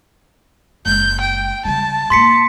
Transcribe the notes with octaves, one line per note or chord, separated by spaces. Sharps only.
F#1 G#3 G6
G5
C#3 G3 A5
G#2 A#3 C6 B6 C#7